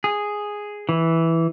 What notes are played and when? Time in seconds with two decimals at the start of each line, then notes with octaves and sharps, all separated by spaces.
0.04 G#4
0.89 E3